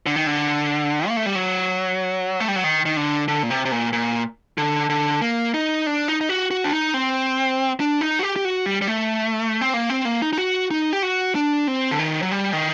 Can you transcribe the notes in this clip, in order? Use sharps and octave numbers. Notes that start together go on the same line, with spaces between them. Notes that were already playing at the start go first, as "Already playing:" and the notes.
D3
D#3
D3
A#3
A3
G3
F#3
A3
G3
F#3
D#3
D#3
D3
D3
A#2
C3
C3
A#2
A#2
D3
D3
A#3
D#4
D4
D#4
D#4
F#4
F#4
D4
D#4
C4
D4
D#4
F#4
G4
G4
F#4
G3
G3
A3
C4
A#3
C4
A#3
D#4
D#4
F#4
D#4
G4
F#4
D4
C4
D3
D#3
F#3
G3
D#3